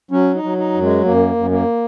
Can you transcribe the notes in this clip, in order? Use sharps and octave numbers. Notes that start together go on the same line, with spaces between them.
F#3 C#4
D#4
F#3
D#4
F#2
G#3
F#2 A#3
F#2
A#3